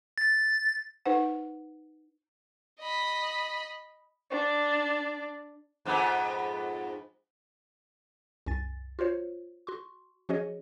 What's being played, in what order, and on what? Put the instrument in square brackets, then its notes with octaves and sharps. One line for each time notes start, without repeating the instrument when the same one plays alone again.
[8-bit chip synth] A6
[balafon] D#4 B4 C5 F#5
[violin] D#5 B5
[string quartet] D4
[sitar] F2 G#2 B3
[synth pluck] C2 F#2 G#5 A6
F4 F#4 C5 C#5
F#4 C6 C#6
F3 C#4 F#4 G#4 C#5 D#5